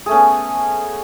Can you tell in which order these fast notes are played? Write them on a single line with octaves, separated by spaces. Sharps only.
G#4 A3 C#4 B3